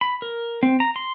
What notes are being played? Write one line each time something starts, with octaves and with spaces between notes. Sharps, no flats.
B5
A#4
C4
A#5
C6